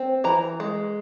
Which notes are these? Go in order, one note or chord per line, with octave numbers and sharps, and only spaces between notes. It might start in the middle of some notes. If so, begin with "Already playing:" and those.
Already playing: C4
E3 A#5
G#3